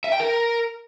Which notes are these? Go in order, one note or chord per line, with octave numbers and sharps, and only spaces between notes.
E5
G5
A#4